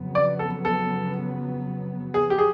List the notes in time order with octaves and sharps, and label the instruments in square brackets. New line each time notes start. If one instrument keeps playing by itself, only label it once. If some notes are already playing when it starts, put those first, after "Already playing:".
Already playing: [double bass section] F2 C#3 F#3 B3
[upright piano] D5
A4
A4
G#4
G4
G#4